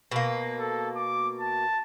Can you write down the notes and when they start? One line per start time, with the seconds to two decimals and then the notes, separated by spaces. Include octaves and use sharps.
0.11 B2 A#3
0.60 A4
0.96 D6
1.40 A5